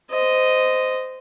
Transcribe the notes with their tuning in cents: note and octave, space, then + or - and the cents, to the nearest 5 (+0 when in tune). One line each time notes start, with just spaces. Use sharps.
C5 -20 D#5 +0